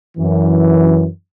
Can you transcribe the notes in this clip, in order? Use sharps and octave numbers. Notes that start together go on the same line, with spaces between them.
F#2 E3